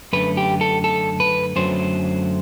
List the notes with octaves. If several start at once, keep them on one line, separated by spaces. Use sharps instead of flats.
F#2 D3 A3 B4
G4
A4
A4
B4
F#2 D3 F#3 A3 C5